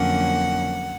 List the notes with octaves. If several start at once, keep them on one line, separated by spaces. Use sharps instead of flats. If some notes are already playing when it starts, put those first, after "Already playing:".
Already playing: F2 D3 F#3 A#3 C#4 F#5